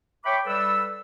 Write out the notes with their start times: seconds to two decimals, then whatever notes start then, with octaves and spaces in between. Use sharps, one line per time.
0.25 C#5 E5 G5 B5 C#6 D6
0.46 G3 A4 B4 E6